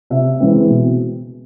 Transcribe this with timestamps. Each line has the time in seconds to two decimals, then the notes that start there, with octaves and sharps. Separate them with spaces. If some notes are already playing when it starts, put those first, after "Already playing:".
0.10 C3 E5
0.40 E3 G#3 C4
0.69 B2